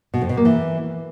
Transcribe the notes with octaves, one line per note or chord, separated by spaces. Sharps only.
B2
F2
B2
A#3
E3